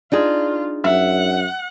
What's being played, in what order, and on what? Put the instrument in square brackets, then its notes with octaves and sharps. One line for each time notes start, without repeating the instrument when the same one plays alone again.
[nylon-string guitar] D4 D#4 G#4 [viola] F4
[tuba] F#2 [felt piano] E5 [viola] F#5